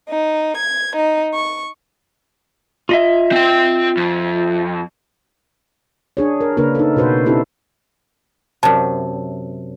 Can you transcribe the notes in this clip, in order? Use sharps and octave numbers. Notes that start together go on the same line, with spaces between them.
D#4
G#6
D#4
C#6
F4 D#5 E5
C4 G5
F2
D4 G#4 C#5
A#4
C#3 A#3 D4 G#4 A#4 B4
D#4 A4
B2 F#4 B4 C5
C4 D4 E4 G4 A4
F#2 C3 A5